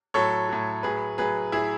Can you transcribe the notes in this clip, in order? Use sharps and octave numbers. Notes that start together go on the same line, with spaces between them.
A2 F#3 A4 C#5
A2 F#3
A2 F#3 G#4 B4
A2 F#3 G#4 B4
A2 F#3 E4 G#4